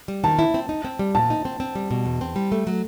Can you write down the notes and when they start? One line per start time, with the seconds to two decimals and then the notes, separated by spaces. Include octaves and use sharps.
0.08 G3
0.24 D#3 A5
0.39 E4
0.54 C4
0.69 D#4
0.85 C4
0.99 G3
1.15 A#2 A5
1.30 D#4
1.45 C4
1.60 C4
1.75 G3
1.91 B2
2.05 E2
2.21 C4
2.36 G3
2.52 A3
2.67 F#3